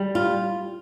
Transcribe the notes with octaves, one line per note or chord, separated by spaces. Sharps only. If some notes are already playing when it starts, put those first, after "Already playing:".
Already playing: G3
F4